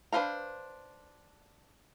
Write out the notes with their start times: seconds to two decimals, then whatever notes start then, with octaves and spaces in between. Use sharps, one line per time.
0.12 D4 B4 C5 F5 A#5